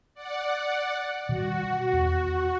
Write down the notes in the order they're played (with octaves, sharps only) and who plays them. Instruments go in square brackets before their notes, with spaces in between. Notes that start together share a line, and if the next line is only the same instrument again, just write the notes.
[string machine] D5 F#5
[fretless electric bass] B2 D#3 G3 [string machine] F#4
[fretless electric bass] E2